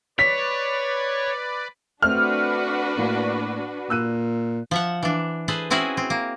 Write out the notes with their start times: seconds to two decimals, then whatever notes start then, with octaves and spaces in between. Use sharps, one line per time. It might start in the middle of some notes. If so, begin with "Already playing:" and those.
0.19 B4 C#5 D5 B6
2.02 A3 C4 D4 F#4 B4 F6
2.97 A2 A#3
3.90 A#2 E6 F#6 D#7
4.71 F3 E5 F#5
5.03 E3 D4
5.48 G#4 A4 B4 C5
5.70 C4 C#4 E4 F#4 G#4 B4
5.97 C4
6.10 A#3